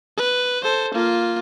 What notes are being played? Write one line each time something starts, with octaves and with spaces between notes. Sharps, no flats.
B4
A4 C5
A#3 F4